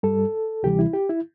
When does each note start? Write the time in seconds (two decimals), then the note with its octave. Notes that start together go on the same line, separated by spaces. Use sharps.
0.03 G2 G3 A4
0.63 D2 C3 E3 G3 G4
0.79 E4
0.93 G4
1.09 E4